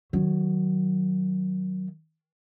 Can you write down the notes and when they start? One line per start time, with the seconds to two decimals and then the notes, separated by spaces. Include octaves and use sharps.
0.13 D#3 F#3